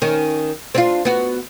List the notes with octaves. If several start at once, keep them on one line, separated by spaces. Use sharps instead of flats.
D#3 C#4
C4 D4 F4
B3 F#4